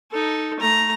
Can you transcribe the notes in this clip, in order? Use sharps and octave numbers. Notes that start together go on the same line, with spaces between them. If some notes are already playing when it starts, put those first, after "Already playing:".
D#4 A4
A3 A#5